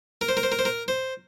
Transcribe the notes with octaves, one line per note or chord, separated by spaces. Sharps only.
A#4
C5
A#4
C5
A#4
C5
A#4
C5